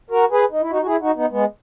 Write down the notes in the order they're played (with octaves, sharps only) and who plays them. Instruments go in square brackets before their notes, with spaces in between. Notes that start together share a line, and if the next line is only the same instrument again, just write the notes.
[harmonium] F#4 A#4
G#4 B4
D#4
E4
D#4 F#4
F#4
E4 G#4
D#4 F#4
B3 D#4
G#3 B3